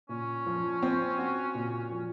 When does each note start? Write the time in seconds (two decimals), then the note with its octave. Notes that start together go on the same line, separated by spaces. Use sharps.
0.09 A#2 C#4
0.46 F3
0.83 C4
1.18 F#4
1.55 A#2
1.92 F3